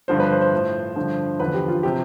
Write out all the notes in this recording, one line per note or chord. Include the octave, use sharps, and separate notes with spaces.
G2 D3 F3 C5
B4
C5
C5
A2 F3
G2 D3 F3
E2 D3 F3 B4
G4
F4
C3 F3 G4